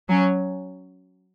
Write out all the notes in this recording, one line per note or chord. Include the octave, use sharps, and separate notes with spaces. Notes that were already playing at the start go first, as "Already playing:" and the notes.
F#3 C#4